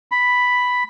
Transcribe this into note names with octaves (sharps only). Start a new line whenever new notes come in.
B5